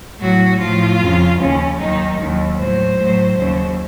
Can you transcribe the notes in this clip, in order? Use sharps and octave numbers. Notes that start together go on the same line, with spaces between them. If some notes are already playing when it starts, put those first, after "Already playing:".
A2 F#3 F#4
A2 F3 F4
F2 C#3 F3
D#2 C#3 F3 C#4
D#2 D#3 F#3 D#4
D#2 D#3 F#3
A2 F#3 C5
A2 F#3
D#2 C#3 F#3